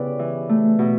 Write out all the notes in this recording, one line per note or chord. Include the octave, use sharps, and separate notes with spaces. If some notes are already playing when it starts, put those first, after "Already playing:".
Already playing: C#3 B3 E4 G4 B4 D5
E3
A3
B2